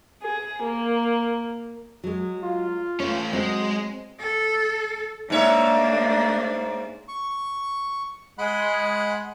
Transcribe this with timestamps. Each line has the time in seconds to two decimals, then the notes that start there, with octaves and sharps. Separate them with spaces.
0.24 G#4
0.62 A#3
2.04 F#3 G#3
2.43 F4
3.00 A3 C#4 C#5
3.33 F#3 G#3 C4
4.19 A4
5.30 G#2 A#3 D4 C#5 E5
7.08 C#6
8.38 G#3 F#5 B5